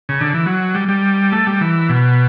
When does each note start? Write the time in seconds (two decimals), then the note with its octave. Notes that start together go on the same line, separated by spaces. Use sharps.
0.09 C#3
0.21 D3
0.34 E3
0.46 F#3
0.75 G3
0.88 G3
1.32 A3
1.47 G3
1.61 E3
1.89 B2